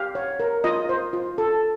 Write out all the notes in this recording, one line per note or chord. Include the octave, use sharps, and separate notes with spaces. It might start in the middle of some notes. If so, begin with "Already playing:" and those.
Already playing: G4 F5
C#5
A#4
F4 D#5
C5
F4
A4